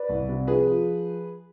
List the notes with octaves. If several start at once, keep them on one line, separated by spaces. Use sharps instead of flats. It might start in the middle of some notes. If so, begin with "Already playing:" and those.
Already playing: B4 D5
C2
C3
F3 G#4 B4
F3